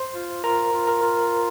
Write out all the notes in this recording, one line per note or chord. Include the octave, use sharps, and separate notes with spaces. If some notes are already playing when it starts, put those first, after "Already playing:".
Already playing: C5 C6
F4
F4 A#4 A#5
F4
A#4 A#5
F4